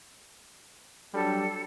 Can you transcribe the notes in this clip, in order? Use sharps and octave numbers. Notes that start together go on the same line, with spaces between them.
F#3 G3 D4 A4